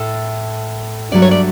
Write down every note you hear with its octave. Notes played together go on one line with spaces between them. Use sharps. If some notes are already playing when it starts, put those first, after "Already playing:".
Already playing: A2 A3 A4
G2 F#3 A3 D5
C#5
D5